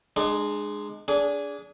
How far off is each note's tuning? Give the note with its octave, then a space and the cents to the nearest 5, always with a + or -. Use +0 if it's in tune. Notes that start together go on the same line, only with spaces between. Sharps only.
G#3 +0 D4 +40
D4 -25 G#4 +0